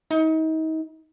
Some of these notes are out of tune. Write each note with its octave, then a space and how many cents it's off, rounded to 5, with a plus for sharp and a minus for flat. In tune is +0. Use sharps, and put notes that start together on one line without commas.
D#4 +35